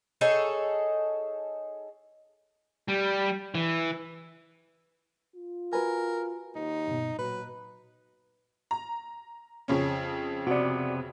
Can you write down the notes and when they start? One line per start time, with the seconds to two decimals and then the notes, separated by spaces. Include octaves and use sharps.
0.21 D#4 G#4 A4 C#5
2.88 G3
3.55 E3
5.36 F4
5.73 F#4 A#4 B4 G#5
6.56 D#2 D#4
6.87 G2 B2
7.19 A#2 F#3 B4
8.71 A#5
9.68 F2 C#3 C#4
10.47 C3 B3 F#4 D5